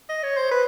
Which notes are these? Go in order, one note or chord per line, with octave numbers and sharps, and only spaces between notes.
D#5
C#5
C5
B4